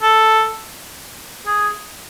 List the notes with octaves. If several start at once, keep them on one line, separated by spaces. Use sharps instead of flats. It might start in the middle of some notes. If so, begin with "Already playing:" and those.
A4
G#4